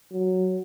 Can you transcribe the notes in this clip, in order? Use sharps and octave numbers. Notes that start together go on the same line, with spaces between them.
F#3